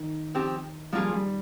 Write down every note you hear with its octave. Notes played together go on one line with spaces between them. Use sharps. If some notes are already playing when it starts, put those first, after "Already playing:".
Already playing: D#3
F3 C4 G4
F3 G3 A#3 F4 G#4
G3